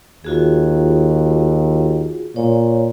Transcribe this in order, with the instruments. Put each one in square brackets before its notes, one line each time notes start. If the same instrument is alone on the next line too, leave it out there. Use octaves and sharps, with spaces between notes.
[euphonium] D#2 [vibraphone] F4 F#4 G#4
[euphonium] A#2 [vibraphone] C#5